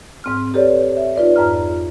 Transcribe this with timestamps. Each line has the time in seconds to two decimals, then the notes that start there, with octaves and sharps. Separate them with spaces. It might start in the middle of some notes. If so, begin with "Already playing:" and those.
0.24 G#2 C4 F6
0.54 G4 A4 B4 C#5 D5
0.97 E5
1.16 D#4 F4 B4 D5
1.36 F2 G#2 A#5 F6